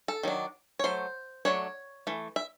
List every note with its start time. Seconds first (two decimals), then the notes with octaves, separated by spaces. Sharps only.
0.08 A4
0.23 D#3 F#3 D4
0.79 C#5
0.84 F#3 A3 C5
1.45 F#3 A3 D4 C#5
2.07 E3 A3
2.36 E5